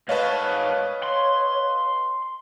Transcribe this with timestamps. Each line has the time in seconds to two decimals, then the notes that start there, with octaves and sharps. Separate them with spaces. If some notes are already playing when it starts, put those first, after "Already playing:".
0.09 G#2 B4 C#5 D#5 F5 A5
1.04 C6